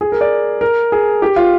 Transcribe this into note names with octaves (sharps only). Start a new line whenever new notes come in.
G#4
A#4
D5
A#4
G#4
G4
F4